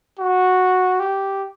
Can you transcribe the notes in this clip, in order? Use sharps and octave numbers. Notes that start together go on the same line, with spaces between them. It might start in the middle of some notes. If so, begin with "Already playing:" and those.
F#4
G4